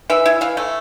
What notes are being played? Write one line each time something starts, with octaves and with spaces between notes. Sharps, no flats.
E3 E5
E4
E3 F5
A3